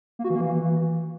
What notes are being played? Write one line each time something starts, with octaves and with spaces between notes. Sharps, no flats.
A#3
F#4
E3
A#3
E3